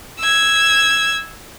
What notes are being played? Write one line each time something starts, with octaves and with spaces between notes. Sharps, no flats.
E6 G#6